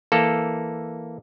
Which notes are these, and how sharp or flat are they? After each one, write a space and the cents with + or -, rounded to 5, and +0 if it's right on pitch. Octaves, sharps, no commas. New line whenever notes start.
E3 +0 A#3 +0 A4 +0